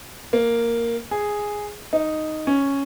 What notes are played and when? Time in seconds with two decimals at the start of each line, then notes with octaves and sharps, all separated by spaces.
0.33 A#3
1.11 G#4
1.93 D#4
2.47 C#4